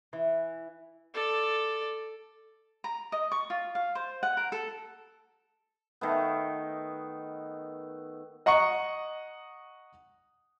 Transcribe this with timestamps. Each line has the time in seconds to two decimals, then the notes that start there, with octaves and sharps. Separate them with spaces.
0.13 E3
1.14 A4 D5
2.84 A#5
3.12 D#5
3.32 C#6
3.50 F4
3.75 F5
3.95 C5
4.23 F#5
4.37 A#4
4.52 A4
6.01 D#3 A3 B3
8.46 D#5 F#5 A#5 C#6 C#7